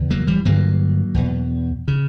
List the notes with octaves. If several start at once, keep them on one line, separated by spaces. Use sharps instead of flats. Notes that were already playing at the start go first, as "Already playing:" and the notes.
Already playing: E2 C#3
F#3 A#3
E3 G3
G2 D3 F#3 A#3
E2 B2
C#3